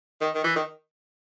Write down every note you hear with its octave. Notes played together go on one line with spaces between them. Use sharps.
D#3
D#3
E3
D#3